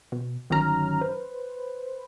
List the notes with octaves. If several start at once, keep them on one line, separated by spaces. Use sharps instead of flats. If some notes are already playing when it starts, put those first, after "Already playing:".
B2
G1 D#3 F#3 C#4 A#5 F6
B4 C5